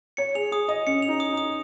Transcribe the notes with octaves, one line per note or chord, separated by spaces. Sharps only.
C#5 C#7
G#4 F7
G#4 D#6
D#5 D#6
C#4 C#7
F7
D#4
D#6
D#4
D#6